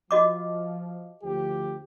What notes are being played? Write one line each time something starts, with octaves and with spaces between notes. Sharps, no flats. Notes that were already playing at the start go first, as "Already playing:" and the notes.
F3 F#4 D#5 D6
D2 F3 G4